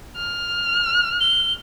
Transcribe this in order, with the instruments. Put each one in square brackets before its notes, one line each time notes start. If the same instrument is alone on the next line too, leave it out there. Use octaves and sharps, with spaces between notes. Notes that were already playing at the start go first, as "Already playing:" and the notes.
[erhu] F6
[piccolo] G7